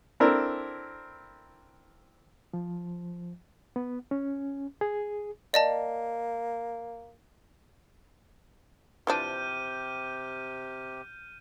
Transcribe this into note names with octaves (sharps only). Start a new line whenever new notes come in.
C4 D4 E4 A4 A#4
F3
B3
C#4
G#4
A#3 D5 D#5 A5
C3 E3 F3 D4 G4 F6 G6 D#7